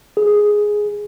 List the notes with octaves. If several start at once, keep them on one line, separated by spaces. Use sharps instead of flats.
G#4